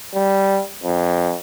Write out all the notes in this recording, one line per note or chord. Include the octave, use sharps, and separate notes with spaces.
G3
F2